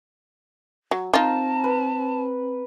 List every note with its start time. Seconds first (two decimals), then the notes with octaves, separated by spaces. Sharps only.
0.91 F#3
1.14 C4 D#4 F4 A#4 A5
1.64 B4